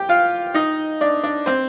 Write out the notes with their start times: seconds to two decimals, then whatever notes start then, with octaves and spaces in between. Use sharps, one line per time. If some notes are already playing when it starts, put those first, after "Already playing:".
Already playing: G4 G5
0.09 F4 F5
0.54 D#4 D#5
1.01 D4 D5
1.23 D4 D5
1.46 C4 C5